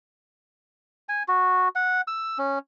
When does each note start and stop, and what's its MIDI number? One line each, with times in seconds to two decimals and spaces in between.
1.09 1.23 80
1.28 1.68 66
1.76 2.01 78
2.07 2.38 88
2.38 2.59 61